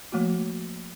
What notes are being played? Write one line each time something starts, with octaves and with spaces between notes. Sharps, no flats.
F3 A3 A#3 F#4